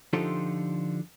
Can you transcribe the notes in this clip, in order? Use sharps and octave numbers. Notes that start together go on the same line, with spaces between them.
D3 F3 D#4 F4 G4 A4